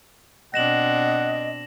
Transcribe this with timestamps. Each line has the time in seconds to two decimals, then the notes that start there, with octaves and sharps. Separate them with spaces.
0.54 B2 C4 D4 D#5 F#5 A#6 E7 F#7